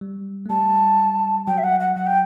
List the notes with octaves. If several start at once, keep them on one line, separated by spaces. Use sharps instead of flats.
G3
A3
G3 A5
F#3 G5
E5
F#5
F#5
F#3 F#5
G5